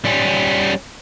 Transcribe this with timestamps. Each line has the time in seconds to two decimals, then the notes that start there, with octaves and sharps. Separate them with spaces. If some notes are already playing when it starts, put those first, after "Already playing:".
0.05 G3 C#4